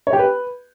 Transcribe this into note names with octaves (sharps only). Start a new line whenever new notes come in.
C#5
G4
B4